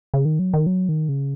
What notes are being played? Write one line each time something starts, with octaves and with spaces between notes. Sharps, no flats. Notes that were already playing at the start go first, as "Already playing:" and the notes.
C#3
D#3
F#3
D#3
F#3
D#3
C#3